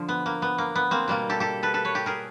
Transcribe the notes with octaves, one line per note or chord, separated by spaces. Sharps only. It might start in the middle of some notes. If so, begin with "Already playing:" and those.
Already playing: D3 F3
B3
A#3
B3
A#3
B3
A#3 C4
B2 G3 A#3
G4 A4
G4 A4
A4 B4
A4 B4
B4 C#5
G4 A4
G#4 A#4